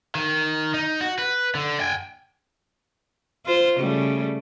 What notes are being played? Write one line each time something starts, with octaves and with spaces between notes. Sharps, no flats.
D#3
D#4
F#4
B4
D3
G5 G#5
F4 C5
C#3 G3 A3